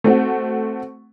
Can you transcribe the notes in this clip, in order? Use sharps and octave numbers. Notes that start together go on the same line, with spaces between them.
A3 C4 F#4